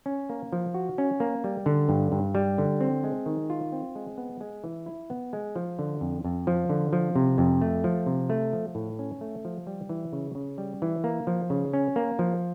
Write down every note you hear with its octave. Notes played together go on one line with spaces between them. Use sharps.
C#4
A#3
F3
F#4
C#4
A#3
G3
D3
G2
G2
G3
D3
C4
G#3
D#3
F4
C4
G#3
B3
G#3
E3
E4
B3
G#3
F3
D3
F2
F2
F3
D3
F3
C3
F2
A3
F3
C3
A3
F3
A2
C#4
A3
F3
G3
E3
C#3
C#3
G3
E3
A#3
F3
C#3
C#4
A#3
F3